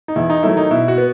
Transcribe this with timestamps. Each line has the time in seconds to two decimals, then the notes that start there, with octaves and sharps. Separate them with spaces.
0.08 D#4
0.16 E2 E4
0.30 D#4
0.43 D#3 F#3 A3 E4
0.57 D#4
0.70 B2 E4
0.88 F#4
0.98 B3